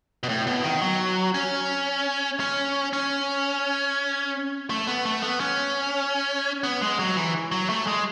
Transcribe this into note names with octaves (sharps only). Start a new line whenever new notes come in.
B2
A2
B2
D#3
F#3
C#4
C#4
C#4
A3
B3
A3
B3
C#4
B3
G#3
F#3
E3
F#3
A3
G#3